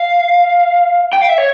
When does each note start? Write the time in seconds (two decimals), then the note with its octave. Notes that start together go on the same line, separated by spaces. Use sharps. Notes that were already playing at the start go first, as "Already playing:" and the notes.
Already playing: F5
1.13 G5
1.22 F5
1.29 E5
1.38 C#5